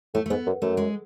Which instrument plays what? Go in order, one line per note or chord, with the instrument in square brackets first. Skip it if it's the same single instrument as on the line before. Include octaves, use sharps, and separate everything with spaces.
[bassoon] A2 [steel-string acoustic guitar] A3
[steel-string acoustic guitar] A3
[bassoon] G#2 [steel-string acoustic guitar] B3
[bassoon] F#2
[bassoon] F#2 [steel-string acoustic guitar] A3
[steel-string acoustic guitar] G#3